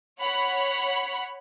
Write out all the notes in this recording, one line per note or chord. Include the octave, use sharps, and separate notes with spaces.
C#5 F#5 B5